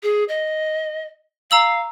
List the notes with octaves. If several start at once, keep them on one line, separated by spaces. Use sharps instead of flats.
G#4
D#5
F5 A#5 E6 F#7